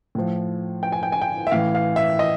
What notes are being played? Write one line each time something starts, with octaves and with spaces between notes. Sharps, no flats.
A2 F3
G5
G#5
G5
G#5
G5
E5
A2 E3 F5
F5
E5
D#5